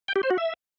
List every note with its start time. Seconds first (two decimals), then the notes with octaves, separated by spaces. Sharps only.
0.08 G5
0.16 G4
0.23 C5
0.30 F#4
0.38 E5